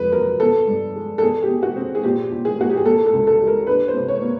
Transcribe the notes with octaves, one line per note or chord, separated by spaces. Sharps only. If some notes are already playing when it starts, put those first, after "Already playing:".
Already playing: F2 B4
F#3 A#4
B3 A4
G2
G#3
A4
B2 G#4
G4
B2
F#4
C4
G#4
A#2 G4
A#2
G#4
A#3 F#4
G4
G#4
A#3 A4
A4
C#2
A4
G3
A#4
D4 B4
C5
C3
C#5
A#3